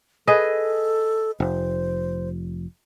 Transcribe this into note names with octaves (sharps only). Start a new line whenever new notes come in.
G#4 A4 B4 D#5
F1 C5